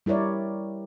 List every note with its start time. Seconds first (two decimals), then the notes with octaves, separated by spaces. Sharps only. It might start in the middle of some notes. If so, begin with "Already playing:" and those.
0.06 G3 E4 A#4 C#5 D5